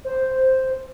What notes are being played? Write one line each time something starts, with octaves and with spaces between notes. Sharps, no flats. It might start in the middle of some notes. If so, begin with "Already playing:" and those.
C5